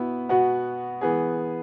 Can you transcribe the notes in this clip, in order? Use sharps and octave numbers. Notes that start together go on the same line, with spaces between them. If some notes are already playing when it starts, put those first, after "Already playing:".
Already playing: B2 B3 E4
B2 B3 F#4
E3 B3 G#4